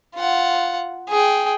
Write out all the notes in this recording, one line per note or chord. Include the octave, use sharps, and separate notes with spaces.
F4 F#5
G#4 G5